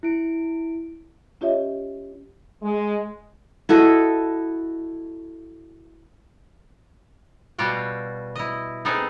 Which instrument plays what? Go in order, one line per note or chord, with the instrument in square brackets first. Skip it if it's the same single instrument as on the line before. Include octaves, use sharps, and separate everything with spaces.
[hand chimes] E4 D7
[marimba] C#4 F4 G4 C#5 D#5 E5
[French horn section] G#3
[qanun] E4 F#4 A4 D#5
[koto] B2 G3 F4 F#4 G5
E4 D#5
B3 C4 D#4 G#4 A4